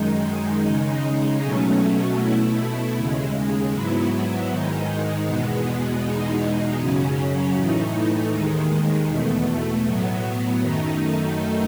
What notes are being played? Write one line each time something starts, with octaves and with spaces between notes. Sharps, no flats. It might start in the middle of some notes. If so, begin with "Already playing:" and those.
Already playing: F#2 D#3 G#3 D#4
C#3 G#3 D#4
B2 F#3 A3 C#4
B2 A3 E4
D#2 C#3 G#3
G#2 F#3 B3 E4
G#2 D#3 G#3 D#4
E2 B2 G#3 B3
E2 B2 G#3 D#4
F#2 C#3 F#3 C#4
A2 E3 A3 D#4
D#2 D#3 G#3
E2 B2 A3
A2 F#3 B3
F#2 D#3 A3 D#4